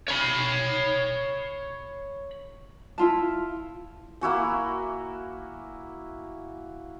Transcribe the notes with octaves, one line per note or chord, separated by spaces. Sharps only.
C#5 B5
E4 F4 A5
A#3 E4 F#4 G#5